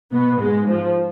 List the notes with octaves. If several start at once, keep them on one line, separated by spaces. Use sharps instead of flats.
B2 B3
G#2 G#3
F3